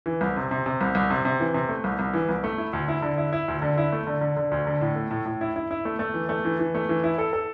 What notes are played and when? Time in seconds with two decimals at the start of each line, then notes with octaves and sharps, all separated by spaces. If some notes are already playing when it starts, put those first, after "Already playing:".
0.06 E3
0.21 C2
0.36 C3
0.51 C3
0.66 C3
0.81 C2
0.95 C2
1.10 C3
1.25 C3
1.40 E3
1.54 C3
1.69 A3
1.84 C2
1.99 C2
2.14 E3
2.29 C2
2.44 A3
2.58 E4
2.73 D2
2.88 E4
3.02 D3
3.18 E4
3.33 E4
3.48 D2
3.62 D3
3.78 E4
3.92 A3
4.07 D3
4.21 D3
4.37 D3
4.51 D2
4.67 D3
4.81 A2
4.96 A3
5.11 A2
5.26 A2
5.41 E4
5.56 E4
5.71 E4
5.85 A3
5.99 A3
6.14 E3
6.29 A3
6.45 E3
6.59 E3
6.75 A3
6.89 E3
7.04 E4
7.18 A4
7.33 A4